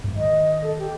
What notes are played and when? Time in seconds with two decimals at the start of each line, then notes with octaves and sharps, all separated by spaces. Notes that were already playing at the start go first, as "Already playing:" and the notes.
0.04 G#2 A3
0.16 D#3 D#5
0.62 A4
0.79 G4